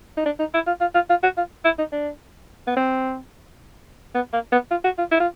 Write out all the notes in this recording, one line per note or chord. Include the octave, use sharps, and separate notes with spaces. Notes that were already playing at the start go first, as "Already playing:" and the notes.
D#4
D4
D#4
E4
F4
F4
F4
F4
F#4
F4
E4
D#4
D4
B3
C4
B3
A#3
B3
F4
F#4
F4
E4
F4